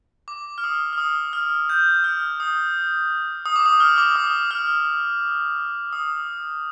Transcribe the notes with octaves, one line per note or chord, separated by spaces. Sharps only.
D6
F6
D#6
F6
D#6
F6
G6
F6
D#6
D#6
D6
D#6
F6
D6
D#6
F6
D#6